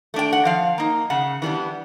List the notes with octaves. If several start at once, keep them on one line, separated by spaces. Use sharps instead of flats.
A3 D4 G5
F#5
F3 F5
A#3 D#4
C#3 F#5
E3 G3 B3 D4